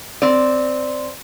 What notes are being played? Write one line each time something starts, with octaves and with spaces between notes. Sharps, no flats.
C4 D5